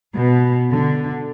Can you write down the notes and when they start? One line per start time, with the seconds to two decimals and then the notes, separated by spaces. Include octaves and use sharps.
0.15 B2
0.71 D3